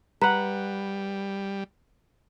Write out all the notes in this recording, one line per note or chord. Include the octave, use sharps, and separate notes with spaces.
G3 B4 F#5 A#5